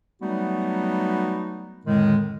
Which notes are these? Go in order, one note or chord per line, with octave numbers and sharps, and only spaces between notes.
F#3 G3 A3 B3 D#4 F#4
F2 A2 D3 D#3 G#3